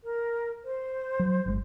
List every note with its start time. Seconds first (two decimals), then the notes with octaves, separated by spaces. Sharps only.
0.03 A#4
0.63 C5
1.19 F#3
1.46 G1 A#2 G#3